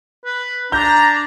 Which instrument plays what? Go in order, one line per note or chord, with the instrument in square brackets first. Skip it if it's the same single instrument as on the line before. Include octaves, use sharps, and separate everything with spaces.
[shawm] B4
[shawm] D4 [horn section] A#5 [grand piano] G6